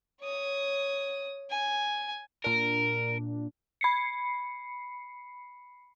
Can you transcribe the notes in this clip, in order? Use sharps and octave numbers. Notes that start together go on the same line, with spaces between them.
C#5 D#6
G#5
A#2 D4 A#4
B5 C7 C#7